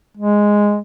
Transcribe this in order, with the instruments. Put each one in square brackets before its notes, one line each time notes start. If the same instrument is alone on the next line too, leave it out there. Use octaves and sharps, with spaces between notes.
[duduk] G#3